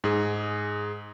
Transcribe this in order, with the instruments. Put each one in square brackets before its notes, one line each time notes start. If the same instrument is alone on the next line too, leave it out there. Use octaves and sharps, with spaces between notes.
[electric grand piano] G#2 G#4